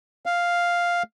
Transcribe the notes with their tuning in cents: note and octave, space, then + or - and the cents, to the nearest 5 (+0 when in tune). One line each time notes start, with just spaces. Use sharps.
F5 +0